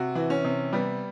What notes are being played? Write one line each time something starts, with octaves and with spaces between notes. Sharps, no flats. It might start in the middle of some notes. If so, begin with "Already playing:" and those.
Already playing: C3 F#4
E3
C#4
C3
G3 B3